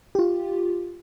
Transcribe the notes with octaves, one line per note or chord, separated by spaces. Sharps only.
F4 G4